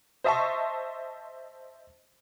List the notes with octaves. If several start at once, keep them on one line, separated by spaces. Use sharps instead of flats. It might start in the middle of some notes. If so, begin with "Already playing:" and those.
C5 D#5 E5 A5 C6 C#6